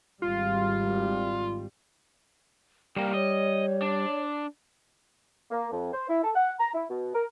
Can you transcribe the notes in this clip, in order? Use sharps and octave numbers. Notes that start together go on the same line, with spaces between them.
G#1 G3 F4
C2 G3 A#3 G5
C#5 D#5
D4
A#3
F2
C5
E4
A4
F#5
A#5
E4
B2
A#4